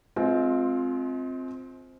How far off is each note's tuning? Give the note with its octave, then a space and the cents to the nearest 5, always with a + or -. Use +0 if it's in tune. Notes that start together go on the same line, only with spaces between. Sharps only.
G#3 +35 C4 +0 F4 +10